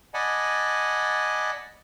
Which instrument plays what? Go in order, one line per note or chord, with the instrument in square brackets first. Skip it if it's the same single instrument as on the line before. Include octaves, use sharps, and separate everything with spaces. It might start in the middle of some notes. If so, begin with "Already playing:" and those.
[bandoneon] D5 D#5 F#5 G#5 A5 B5